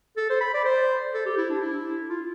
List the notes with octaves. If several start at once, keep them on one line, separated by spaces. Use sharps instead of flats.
A4
C5
B5
D5
C5
A4
G4
E4
D4
E4
F4